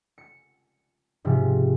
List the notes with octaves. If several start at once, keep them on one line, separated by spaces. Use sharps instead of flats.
C#7
G#2 C3 F3